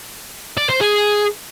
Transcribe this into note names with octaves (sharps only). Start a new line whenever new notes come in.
D5
C5
G#4